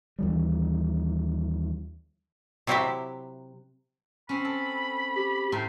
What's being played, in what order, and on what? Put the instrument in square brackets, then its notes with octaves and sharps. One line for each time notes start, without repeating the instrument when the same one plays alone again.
[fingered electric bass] D#2 E3 G3
[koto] C3 F#3 C4 E4 G4 E5
[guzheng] C4 C#4 [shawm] B5
[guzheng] A4
[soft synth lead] G4
[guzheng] A2 A4 C6 [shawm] G4 [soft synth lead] A#5